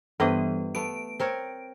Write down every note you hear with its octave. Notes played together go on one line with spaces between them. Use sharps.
G2 E3 G3 B3 B4 D#5
A3 B3 D7
C4 A#4 C#5